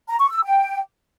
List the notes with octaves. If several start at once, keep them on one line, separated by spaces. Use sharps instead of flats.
A#5
C#6
E6
G5